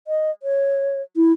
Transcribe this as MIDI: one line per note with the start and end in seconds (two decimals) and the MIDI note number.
0.08 0.31 75
0.43 1.02 73
1.16 1.33 64